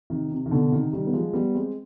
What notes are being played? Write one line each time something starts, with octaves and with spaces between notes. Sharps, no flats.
C3 D#3
C3
D#3
B2 D3
C3 D#3
D#3 G3
B3
F3 G#3
G3 B3
G#3 C4